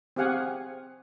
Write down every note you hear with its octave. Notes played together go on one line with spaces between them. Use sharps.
C4 G4 G#4 F5 F#5 G#5